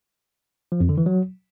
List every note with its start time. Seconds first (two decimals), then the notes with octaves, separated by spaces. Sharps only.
0.72 F3
0.80 F2
0.89 D3
0.98 E3
1.06 F#3